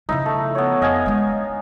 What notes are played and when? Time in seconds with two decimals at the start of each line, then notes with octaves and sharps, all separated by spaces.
0.09 C#3 F3 D#4 E4
0.26 A3
0.55 B3 C#5
0.82 F2 D#5 F5 G#5
1.06 G#3 D4